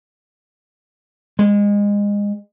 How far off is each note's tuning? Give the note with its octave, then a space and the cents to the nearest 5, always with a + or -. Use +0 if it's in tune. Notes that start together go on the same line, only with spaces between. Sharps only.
G#3 -25